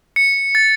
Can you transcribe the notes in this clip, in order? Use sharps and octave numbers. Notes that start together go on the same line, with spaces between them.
C#7
A6